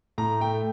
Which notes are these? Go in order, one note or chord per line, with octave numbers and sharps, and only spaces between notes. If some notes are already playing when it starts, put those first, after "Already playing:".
A2 A#5
A3 G5